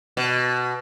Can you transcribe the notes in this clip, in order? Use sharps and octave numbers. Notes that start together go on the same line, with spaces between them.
B2